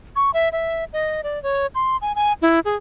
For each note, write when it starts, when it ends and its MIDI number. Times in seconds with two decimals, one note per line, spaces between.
0.16 0.31 85
0.34 0.49 76
0.52 0.84 76
0.93 1.21 75
1.23 1.41 74
1.43 1.67 73
1.75 1.97 84
2.02 2.15 80
2.15 2.33 80
2.42 2.60 64
2.65 2.76 68